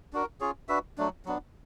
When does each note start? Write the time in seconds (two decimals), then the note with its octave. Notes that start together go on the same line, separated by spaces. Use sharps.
0.13 D4 F#4 A#4
0.40 C#4 F4 G#4 C#5
0.68 D4 F#4 B4 E5
0.98 F#3 A3 D4
1.25 F#3 B3 D4